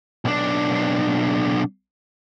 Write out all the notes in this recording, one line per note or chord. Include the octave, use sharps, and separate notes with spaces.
B1 D4